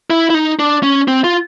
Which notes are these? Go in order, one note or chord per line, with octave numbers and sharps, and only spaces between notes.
E4
E4
D#4
D4
C#4
C4
F4